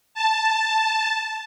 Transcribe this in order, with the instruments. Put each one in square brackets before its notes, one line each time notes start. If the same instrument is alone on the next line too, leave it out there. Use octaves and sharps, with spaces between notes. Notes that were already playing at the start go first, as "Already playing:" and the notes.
[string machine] A5